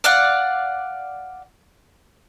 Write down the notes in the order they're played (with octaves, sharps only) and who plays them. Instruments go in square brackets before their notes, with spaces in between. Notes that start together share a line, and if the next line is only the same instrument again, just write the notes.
[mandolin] D5 F5 F#5